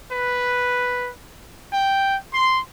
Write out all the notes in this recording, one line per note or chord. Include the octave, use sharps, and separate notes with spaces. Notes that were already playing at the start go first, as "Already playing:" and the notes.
B4
G5
C6